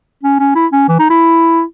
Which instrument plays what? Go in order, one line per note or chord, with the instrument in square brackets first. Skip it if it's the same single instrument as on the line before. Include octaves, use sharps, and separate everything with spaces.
[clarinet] C#4
C#4
E4
C#4
E3
D#4
E4